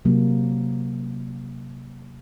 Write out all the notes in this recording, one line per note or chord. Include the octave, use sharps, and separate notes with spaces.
C3 F#3 A#3